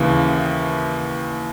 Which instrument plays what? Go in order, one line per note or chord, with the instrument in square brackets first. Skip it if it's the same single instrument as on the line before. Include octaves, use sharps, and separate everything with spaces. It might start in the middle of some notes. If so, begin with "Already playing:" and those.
Already playing: [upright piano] D#2 C#3 E3